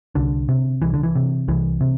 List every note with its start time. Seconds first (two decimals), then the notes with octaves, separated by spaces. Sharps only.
0.15 C2 D3
0.49 C3
0.82 C2 E3
0.94 D3
1.03 E3
1.16 C3
1.48 C2 E3
1.81 C3